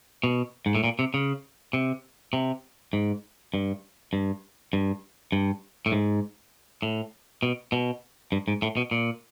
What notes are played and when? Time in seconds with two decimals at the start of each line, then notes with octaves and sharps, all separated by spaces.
0.24 B2
0.66 G#2
0.75 A2
0.84 A#2
0.99 C3
1.14 C#3
1.73 C3
2.33 C3
2.93 G#2
3.54 G2
4.13 G2
4.73 G2
5.32 G2
5.86 A2
5.92 G#2
6.82 A2
7.43 B2
7.72 B2
8.32 G2
8.48 G#2
8.62 A2
8.77 B2
8.91 A#2